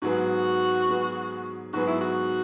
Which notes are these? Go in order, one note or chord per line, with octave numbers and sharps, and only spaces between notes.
G#2 F#3 B3 F#4 G#4 B4
G#2 F#3 B3 G#4 B4
G#2 F#3 B3 F#4 G#4 B4
E4
F#4